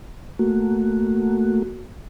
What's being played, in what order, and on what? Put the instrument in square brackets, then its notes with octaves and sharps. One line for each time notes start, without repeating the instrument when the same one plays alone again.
[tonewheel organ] A3 A#3 F#4